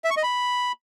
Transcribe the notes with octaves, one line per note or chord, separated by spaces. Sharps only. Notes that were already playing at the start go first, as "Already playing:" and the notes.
E5
C#6
D#5
B5